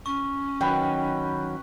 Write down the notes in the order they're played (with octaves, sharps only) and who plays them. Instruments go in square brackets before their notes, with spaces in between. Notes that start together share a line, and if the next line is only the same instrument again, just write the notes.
[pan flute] C#4 [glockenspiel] C#6
[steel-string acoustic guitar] D#3 F#3 [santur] B4 G5